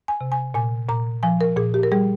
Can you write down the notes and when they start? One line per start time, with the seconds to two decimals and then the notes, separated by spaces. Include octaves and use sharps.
0.08 G#5
0.21 C3
0.32 G#5
0.54 A#2 G#5
0.89 A#2 A#5
1.23 F3 G#5
1.41 A#4
1.57 A#2 G#4
1.74 G4
1.83 A#4
1.92 G3 G#4